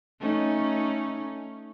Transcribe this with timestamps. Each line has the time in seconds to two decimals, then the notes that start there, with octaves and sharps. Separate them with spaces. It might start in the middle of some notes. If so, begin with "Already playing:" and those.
0.21 A3 C#4 D#4